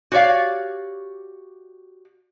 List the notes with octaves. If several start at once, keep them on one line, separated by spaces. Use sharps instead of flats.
F#4 G4 C#5 D5 F5